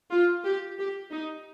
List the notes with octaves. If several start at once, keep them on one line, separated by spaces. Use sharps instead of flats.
F4
G4
G4
D#4